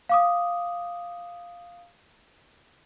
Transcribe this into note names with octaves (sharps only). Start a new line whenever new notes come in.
F5 D6 D#6